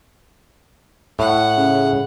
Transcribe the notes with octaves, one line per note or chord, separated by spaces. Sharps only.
A2 F#5
C#3